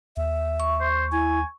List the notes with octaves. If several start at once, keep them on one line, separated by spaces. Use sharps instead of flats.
D#2 E5
C#6
C5
E4 G#5